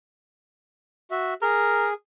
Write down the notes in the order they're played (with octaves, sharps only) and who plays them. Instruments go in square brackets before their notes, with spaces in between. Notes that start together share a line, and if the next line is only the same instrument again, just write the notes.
[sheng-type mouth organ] F#4 E5
[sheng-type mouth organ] G#4 [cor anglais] A#4